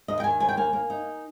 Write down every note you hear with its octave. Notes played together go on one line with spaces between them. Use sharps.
D#2 D#5
G5
D#3 G#5
D#2 G#5
G5
A#3 G#5
A#3
D#4